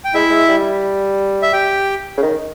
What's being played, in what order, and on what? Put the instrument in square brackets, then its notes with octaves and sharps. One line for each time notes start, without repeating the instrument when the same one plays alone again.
[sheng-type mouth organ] G5
[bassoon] G#3 [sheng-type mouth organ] E4 E5
[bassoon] G#3
G3
[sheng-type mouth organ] E5
G4 G5
[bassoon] C#3
D#3